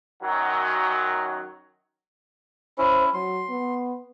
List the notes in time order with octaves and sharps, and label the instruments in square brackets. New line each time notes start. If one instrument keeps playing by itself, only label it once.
[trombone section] F#2 D#3 F#3
[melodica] C#4 E4 [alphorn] C5
[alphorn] F#3 [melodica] C6
[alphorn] B3